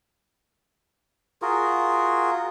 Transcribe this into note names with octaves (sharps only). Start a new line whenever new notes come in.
F4 F#4 G#4 A#4